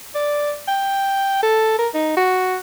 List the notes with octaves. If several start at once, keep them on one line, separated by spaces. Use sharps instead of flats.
D5
G5
A4
A#4
D#4
F#4